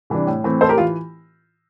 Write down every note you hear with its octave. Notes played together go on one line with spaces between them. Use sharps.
C3 E3 G3 D4
A2
E3 A3 C4
A2 A4 C5
G4 A#4
E3 F4